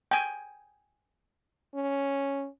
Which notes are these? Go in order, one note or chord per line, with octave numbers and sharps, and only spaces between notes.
G5 G#5
C#4